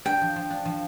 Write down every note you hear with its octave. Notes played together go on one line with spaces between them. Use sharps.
D4 G5
F3
F3
D4
F3